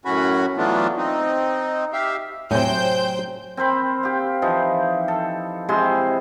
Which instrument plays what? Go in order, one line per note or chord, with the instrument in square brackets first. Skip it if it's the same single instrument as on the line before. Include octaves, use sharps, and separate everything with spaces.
[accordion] F#2 A2 C#4 F#4 B5
E3 F#3 A3 B3 D4 F4
C4 D#4
G4 E5 F5
[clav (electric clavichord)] A2 C3 [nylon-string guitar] F#3 G#5 [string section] C5 G5 G6
[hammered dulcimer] C4 A#4 C5 B5
G4 F5
E3 F3 D#4
A4
C3 G#3 E4 C6